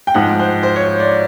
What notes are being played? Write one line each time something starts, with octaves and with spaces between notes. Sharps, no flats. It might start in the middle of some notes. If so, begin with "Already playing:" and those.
G5
G#2 F3 F#5
C5
C5
C#5
D5